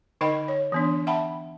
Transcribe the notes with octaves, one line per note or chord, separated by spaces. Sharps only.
D3 D#4 A#4 D#5 G5 B5
C#5
E3 B3 D4
E5 F#5 G5 A5 B5